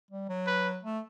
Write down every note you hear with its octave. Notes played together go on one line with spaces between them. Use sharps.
G3
F#3
B4
A3